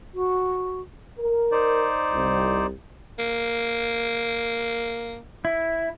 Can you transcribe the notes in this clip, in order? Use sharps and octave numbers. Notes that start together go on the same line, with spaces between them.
F#4
A#4
D#4 C5 D5
C2
A#3
E4